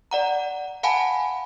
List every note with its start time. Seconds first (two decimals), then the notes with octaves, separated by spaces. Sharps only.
0.11 D5 F#5 A#5
0.83 F5 F#5 G#5 A5 B5